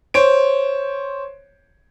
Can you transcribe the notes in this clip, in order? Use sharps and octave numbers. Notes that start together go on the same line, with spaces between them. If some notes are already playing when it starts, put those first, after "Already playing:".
C5 C#5 D7